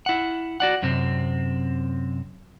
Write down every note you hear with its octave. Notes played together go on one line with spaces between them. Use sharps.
E4 F#5
F#4 D5 F#5
F#2 C3 C4